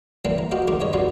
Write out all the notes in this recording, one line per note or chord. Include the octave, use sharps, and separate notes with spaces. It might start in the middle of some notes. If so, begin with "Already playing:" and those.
C3 E3 G3 A#3 C4 A4
A#5
F#4 G4 C5 D#5 F5
C#2 D#3 A#4 C6 D6
G2 C#5 D#5
G2 B2 G3 B3 C4 F4